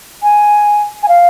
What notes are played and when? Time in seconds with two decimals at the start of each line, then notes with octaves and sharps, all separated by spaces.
0.23 G#5
1.03 G#5
1.08 F5